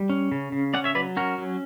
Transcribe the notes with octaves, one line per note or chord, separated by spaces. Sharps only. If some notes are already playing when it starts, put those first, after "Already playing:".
Already playing: G3
C#4
C#3
C#3
C#4 D5 F#5
C#5 E5
F#3 B4 D5
C#4 F#4 A#4
F#3